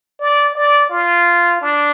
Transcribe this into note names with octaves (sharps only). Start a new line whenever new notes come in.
D5
D5
F4
D4